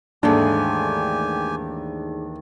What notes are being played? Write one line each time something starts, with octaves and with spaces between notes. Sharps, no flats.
D#2 G#2 E3 G#3 A3 D4 G4 G#5